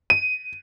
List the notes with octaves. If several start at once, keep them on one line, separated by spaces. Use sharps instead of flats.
D#7